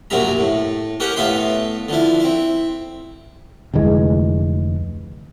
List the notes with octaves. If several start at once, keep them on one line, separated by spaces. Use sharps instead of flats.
A#1 F#2 C3 F#3 E5 A#5
A2
C#4 G4 A#4 F#5 G5
A2 B3 E5 F5 C6
D3 F3 E4
C4 E4
F1 D2 E3 G#3